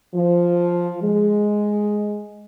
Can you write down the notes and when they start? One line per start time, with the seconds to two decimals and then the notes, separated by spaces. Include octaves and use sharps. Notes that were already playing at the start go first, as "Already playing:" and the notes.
0.15 F3
1.03 G#3